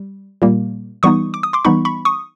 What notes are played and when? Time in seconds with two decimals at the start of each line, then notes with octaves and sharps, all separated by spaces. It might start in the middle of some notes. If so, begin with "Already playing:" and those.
Already playing: G3
0.42 A#2 G3 A#3
1.03 E3 G3 B3 D#4 C#6 D#6
1.34 D6
1.43 D#6
1.53 C6 D6
1.65 E3 G3 B3 D#4 B5 C#6
1.85 B5 C#6
2.05 C#6 D#6